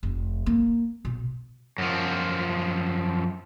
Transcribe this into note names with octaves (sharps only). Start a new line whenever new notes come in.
F1
A#3
B2
F#2 F3